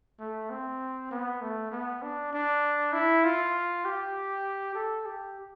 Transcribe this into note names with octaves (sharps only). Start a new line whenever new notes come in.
A3
C4
B3
A3
B3
D4
D4
E4
F4
G4
A4
G4